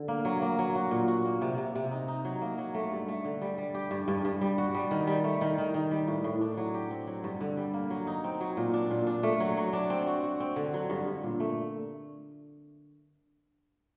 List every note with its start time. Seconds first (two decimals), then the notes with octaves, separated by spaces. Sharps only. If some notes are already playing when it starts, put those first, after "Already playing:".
Already playing: D3
0.08 A#3
0.25 F#3
0.42 A#3
0.59 F#3
0.75 F#4
0.91 A#2
1.08 F#4
1.25 A#3
1.42 C3
1.58 C3
1.75 C3
1.91 D#4
2.08 D#4
2.25 F#3
2.42 A#3
2.58 F#3
2.74 A3
2.91 G2
3.08 A3
3.25 D3
3.41 G3
3.58 G3
3.74 G4
3.91 G2
4.08 G2
4.25 G2
4.41 G3
4.58 F#4
4.75 G3
4.91 D#3
5.07 G3
5.24 A3
5.41 D#3
5.58 D#3
5.74 D#3
5.91 G3
6.08 A2
6.24 A2
6.41 D4
6.57 F#3
6.74 G4
6.91 C4
7.07 F#3
7.24 G2
7.41 D3
7.57 G3
7.74 A#3
7.90 F#3
8.07 D#4
8.24 C4
8.41 F#3
8.57 A#2
8.74 D4
8.91 A#2
9.07 D4
9.23 A3
9.40 F#3
9.57 F#3
9.73 D4
9.90 C4
10.07 F#4
10.23 F#4
10.40 C4
10.56 D3
10.74 F#3
10.90 G2
11.07 G2
11.23 A#2
11.40 A3